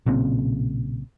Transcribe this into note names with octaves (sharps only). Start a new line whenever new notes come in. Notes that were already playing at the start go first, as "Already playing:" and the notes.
B1 A#2 C#3 C4